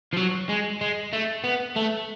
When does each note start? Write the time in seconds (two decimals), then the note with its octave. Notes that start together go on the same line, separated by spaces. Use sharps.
0.13 F3
0.17 F#3
0.49 G#3
0.81 G#3
1.13 A3
1.44 B3
1.76 A3